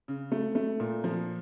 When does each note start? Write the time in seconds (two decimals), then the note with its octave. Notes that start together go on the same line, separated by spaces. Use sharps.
0.08 C#3
0.32 A3
0.55 A3
0.80 A#2
1.04 F3